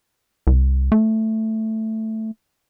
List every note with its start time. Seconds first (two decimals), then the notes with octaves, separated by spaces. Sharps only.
0.47 C2
0.92 A3